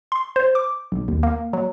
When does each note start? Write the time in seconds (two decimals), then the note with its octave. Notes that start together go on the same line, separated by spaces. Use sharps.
0.12 C6
0.36 C5
0.55 D6
0.92 B1
1.08 D#2
1.23 A#3
1.53 F#3